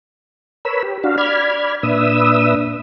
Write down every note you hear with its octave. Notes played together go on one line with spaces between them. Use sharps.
A#4 B4 C#5 B5 E6
G4
D4 F#4 F5
D5 B5 F6 G#6
A#2 D4 B4 E5 D#6 E6